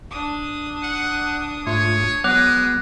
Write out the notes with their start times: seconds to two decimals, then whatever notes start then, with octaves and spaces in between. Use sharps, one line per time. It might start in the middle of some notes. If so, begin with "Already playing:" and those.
0.11 D4 D#6
0.83 F#5
1.67 G#2 A3 F4 C#5
2.24 F#3 G#3 B3 D6 D#6 F#6 F7